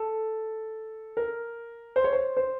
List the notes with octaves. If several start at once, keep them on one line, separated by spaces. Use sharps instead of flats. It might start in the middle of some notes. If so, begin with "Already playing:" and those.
Already playing: A4
A#4
C5
C#5
C5
C5